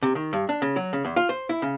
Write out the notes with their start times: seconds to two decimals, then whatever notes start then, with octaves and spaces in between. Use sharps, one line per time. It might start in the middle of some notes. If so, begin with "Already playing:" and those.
0.03 C3
0.15 D#3
0.33 G2
0.49 D4
0.62 C#3
0.76 F#3
0.93 C#3
1.05 E2
1.16 F4
1.29 C5
1.49 E4
1.62 C#3